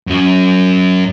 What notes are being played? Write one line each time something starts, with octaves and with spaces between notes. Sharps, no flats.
F#2 F#3